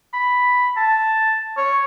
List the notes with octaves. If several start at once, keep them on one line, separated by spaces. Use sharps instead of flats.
B5
A5
C#5